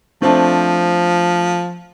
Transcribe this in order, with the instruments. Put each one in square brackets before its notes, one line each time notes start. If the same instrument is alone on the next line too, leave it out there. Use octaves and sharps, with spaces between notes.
[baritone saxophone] F3 [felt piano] A3 C4 D4